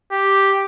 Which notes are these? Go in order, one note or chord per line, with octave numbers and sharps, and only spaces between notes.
G4